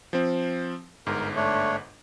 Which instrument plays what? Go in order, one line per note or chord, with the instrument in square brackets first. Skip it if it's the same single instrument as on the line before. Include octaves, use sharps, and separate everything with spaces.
[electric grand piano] F3 C4
[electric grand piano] G1 G#2 [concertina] A#4
[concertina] A3 D4 C#5